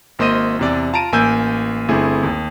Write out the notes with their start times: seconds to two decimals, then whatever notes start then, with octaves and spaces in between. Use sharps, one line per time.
0.19 G#1 A#3 C5 D#5 D#7
0.59 E2 C3 D5
0.93 F4 A5 A#5 D7 D#7
1.12 A1 A#3 G#5 E6 G6
1.88 G1 A3 C4 E4 G#4
2.23 D#2